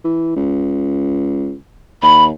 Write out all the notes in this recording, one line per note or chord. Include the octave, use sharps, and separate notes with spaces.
E3
C#2
D#2 B5